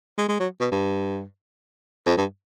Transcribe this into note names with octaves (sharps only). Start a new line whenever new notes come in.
G#3
G#3
F#3
B2
G2
F2
G2